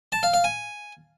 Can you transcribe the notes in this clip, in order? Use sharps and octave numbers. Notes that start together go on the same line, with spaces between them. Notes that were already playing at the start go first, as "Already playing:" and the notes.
A5
F5
F5
G#5